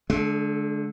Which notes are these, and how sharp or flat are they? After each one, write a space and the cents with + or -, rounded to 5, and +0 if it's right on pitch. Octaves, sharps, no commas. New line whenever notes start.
D3 -5 G#3 +45